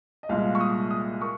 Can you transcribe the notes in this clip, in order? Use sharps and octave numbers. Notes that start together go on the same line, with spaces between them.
D#5
C2 A#2 G#3 F5
C#6
D#6
D#6
A#3 C#6